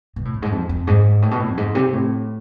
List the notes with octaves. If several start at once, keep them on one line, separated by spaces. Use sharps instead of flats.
B2
A2
F2
G#2
F2
F2
G#2
A2
B2
A2
F2
G#2
C3
A2